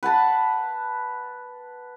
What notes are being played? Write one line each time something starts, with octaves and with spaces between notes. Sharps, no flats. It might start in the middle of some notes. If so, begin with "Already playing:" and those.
B4 F#5 A5 B5